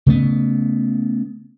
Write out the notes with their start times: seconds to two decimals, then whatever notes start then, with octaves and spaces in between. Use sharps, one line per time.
0.07 C#3 A3 B3